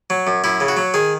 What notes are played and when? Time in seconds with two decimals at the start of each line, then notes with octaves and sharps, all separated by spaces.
0.10 F#3
0.27 F#2
0.44 F#2 E4
0.60 C#3
0.68 F#4
0.77 F#3
0.94 D#3 G#4